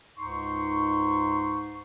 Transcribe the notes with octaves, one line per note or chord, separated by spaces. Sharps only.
C#2 G#2 D#4 C6 C#6